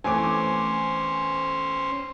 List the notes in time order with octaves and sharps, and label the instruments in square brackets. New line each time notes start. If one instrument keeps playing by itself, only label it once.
[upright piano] E3 A3 C4 [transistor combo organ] C#4 C5 [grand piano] G#5 D6